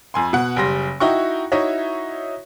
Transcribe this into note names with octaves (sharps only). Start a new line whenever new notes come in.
F2 G#5 C6
B2 F#5
F#1 G3 C6 A#6
D#4 E4 F#4 G5 C#6
D#4 E4 F#4 C#5 E5